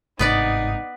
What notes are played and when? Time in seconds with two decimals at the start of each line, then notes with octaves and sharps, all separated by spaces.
0.19 G1 G#2 C3 B3 D#4 B4 D5